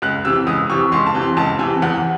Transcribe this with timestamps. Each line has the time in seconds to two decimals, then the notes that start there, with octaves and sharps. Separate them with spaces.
0.02 C#2 F#6
0.25 C3 E3 E6
0.47 C#2 D#6
0.70 C3 E3 C#6
0.92 C#2 C6
1.06 A5
1.15 C3 E3
1.22 C6
1.37 C#2 A5
1.59 C3 E3 G#5
1.82 E2 F#5